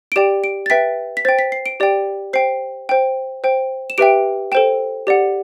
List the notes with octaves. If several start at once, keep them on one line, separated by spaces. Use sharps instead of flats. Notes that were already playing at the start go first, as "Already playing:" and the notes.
D7
G4 D5 G5 E7
D7
A6
B4 E5 G5 B6
B6
C5 G5 A6
B6
C7
D7
G4 D5 G5
C5 G5 C7
C5 G5
C5 G5
E7
G4 B4 E5 G5 D7
A4 C5 G5 E7
G4 D5 F#5